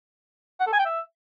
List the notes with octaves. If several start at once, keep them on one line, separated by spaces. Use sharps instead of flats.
F#5
A4
G#5
G5
E5